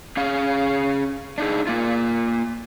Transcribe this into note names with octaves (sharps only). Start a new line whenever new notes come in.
C#4 G#4 F5
D4 D#4 G#4
A#3 F4